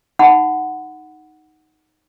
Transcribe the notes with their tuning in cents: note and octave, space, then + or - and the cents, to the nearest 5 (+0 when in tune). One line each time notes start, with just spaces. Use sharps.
D#4 +0 F#5 +0 B5 +35